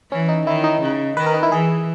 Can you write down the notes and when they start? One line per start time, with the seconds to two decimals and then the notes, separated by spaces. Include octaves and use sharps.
0.12 E3 C#4
0.29 D#4
0.47 D#3 E4
0.64 D#4
0.82 C#3
1.17 D#3 B4
1.26 A#4
1.34 D#4
1.43 E4
1.52 E3 G#4